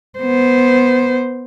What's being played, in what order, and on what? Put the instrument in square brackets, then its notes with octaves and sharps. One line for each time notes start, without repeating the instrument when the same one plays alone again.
[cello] B3 C5